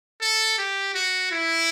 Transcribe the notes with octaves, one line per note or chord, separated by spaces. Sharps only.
A4
G4
F#4
E4